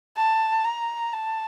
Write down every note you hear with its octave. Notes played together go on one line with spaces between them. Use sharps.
A5
A#5
A5